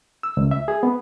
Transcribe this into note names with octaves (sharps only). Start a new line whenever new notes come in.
E6
C#2
E5
G#4
B3